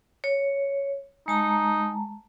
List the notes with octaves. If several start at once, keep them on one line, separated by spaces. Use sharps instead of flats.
C#5
G#3 D#4 A5 A#5